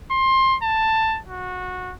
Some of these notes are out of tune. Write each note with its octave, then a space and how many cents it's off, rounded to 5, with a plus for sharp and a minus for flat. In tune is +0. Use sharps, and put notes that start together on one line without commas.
C6 +20
A5 +10
F#4 -20